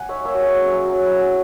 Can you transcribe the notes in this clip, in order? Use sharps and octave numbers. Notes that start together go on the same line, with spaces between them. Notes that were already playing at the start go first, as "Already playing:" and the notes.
Already playing: F#5 G#5
D#4 C#5 E5
A#3 C#5 E5
F#4
A#3 G#4
C#4
F#3
F#3
E4
C#4